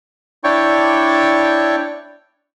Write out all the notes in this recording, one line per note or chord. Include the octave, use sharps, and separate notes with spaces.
D4 E4 C#5 D5 G5 C#6